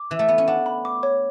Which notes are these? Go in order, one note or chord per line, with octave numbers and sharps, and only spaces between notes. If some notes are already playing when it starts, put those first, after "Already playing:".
Already playing: D6
E3 F#6
A3
B3 E5
C#4
D4 F#5
B5
D6
C#5